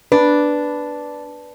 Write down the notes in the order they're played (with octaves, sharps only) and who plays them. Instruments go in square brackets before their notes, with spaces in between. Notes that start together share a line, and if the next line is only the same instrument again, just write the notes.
[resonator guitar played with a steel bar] D4 [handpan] B4